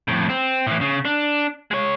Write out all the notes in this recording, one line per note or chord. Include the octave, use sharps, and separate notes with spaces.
F2 A2
C4
A2 E3
C#3
D4
G#3 C#5